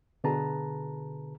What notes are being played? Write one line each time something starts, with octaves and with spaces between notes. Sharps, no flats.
B2 D3 G#4 B4 A5 A#5